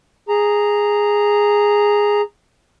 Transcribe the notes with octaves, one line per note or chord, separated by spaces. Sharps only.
G#4 A#5